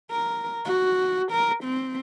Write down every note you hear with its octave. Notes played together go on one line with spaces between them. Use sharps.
A#4
F#4
A#4
C4